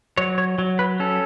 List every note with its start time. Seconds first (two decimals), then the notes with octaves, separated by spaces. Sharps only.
0.17 F#3 C#5
0.38 C#5
0.58 F#3
0.79 B4
1.00 C#4 A4